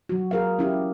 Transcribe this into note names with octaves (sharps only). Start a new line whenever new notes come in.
F#3 F#4
G#4 A#4 F5
C#4 E4 G4